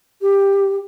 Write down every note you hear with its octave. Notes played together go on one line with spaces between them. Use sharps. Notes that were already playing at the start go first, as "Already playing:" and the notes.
G4